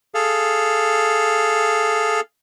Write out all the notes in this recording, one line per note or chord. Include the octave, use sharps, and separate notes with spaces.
G#4 A4 F5